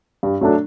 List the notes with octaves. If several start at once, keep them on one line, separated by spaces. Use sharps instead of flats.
G2
F#3 A3 D4